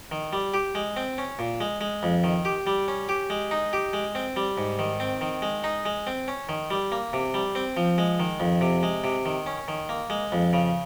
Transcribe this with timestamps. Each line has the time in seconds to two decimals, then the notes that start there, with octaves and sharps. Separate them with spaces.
0.12 D#3
0.33 G3
0.54 G4
0.75 G#3
0.97 C4
1.18 C#4
1.39 A#2
1.60 G#3
1.81 G#3
2.03 F2
2.24 D#3
2.45 G4
2.67 G3
2.88 C#4
3.09 G4
3.30 G#3
3.51 D#4
3.73 G4
3.93 G#3
4.15 C4
4.36 G3
4.58 G#2
4.79 D#3
5.00 C4
5.21 D#3
5.42 G#3
5.64 D#4
5.85 G#3
6.07 C4
6.28 C#4
6.49 D#3
6.71 G3
6.92 A#3
7.13 C3
7.34 G3
7.55 C4
7.77 F3
7.98 G#3
8.20 D#3
8.40 F2
8.61 C3
8.83 G#3
9.04 C3
9.26 D#3
9.46 C#4
9.68 D#3
9.89 A#3
10.10 G#3
10.32 F2
10.53 C#3